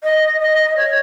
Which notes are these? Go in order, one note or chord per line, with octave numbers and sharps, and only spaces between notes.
D#5
D#5
C#5